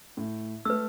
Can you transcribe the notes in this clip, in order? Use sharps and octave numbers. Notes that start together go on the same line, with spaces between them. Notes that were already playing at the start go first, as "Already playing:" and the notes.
A2
A3 B4 E6